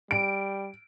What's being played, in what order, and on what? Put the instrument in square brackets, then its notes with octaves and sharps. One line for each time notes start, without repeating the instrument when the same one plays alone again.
[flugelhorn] G3 [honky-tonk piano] D7